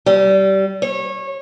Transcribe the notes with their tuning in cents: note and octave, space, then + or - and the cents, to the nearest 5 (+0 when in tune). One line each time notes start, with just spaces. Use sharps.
G3 -20
C#5 -25